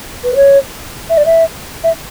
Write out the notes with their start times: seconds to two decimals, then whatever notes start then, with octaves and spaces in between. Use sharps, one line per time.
0.24 B4
0.35 C#5
1.09 E5
1.17 D5
1.25 E5
1.83 E5